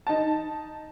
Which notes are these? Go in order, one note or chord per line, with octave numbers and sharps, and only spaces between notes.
D#4 A5